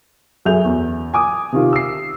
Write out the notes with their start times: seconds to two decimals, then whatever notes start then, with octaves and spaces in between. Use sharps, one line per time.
0.45 F#2 G#4 A4 E5 G6 F7
0.65 E2
1.14 G#5 D6 D#6
1.52 C3 D#3 F4
1.73 E6 C7